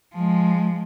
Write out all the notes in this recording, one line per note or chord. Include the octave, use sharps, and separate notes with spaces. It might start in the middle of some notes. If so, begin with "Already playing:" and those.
F3 G#3